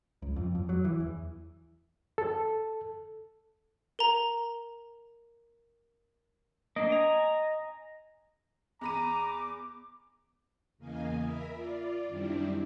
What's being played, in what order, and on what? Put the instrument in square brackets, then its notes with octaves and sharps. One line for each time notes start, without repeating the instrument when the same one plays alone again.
[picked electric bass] C#2
F2
F2
F#3
E3
E2
[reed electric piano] A4
[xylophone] A#4 A#5
[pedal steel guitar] A#3 D4 [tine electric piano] D#5
[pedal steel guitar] G#5 A#5
[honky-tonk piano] E2 B5 D#7 [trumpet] A#5 [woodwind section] D6
[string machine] E2 C#3 A#3 D#5 F5 G#5
A#4 E5 B5
F4 D5
F#2 D#3 G3 C4 D4 E4